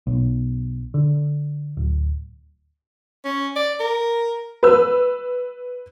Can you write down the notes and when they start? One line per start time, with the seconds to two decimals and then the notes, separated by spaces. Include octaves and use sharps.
0.07 B1
0.94 D3
1.77 D1
3.25 C#4
3.56 D5
3.79 A#4
4.63 B4 E6